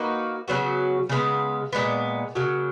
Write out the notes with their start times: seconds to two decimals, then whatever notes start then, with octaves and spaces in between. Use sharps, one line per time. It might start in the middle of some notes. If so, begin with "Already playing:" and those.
Already playing: A#3 D#4 F#4 B4
0.48 C#3 F#3 B3 F#4
1.09 C#3 G#3 B3
1.73 A#2 G#3 B3
2.35 C#3 F#3 A#3